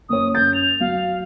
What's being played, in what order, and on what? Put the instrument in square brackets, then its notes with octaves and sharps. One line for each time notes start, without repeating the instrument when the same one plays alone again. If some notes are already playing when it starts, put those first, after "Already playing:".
[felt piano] F#1 C#5 [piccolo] D#6
[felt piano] F#2 A6 [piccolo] G6
[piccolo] F7
[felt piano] F#3 [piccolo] F5